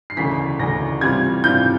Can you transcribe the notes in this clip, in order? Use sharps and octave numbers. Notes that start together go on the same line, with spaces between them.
C7
E1 D2 C#3 E3 B6
E1 D2 C#3 E3 A#6
C3 E3 G3 C4 F4 G#6
C3 E3 G3 C4 F4 G6